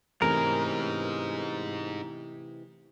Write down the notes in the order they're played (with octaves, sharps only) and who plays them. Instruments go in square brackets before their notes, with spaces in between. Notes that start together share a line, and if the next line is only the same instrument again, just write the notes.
[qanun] C3 [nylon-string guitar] E3 A3 C#4 [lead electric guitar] D#4 G#4 [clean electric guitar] A#4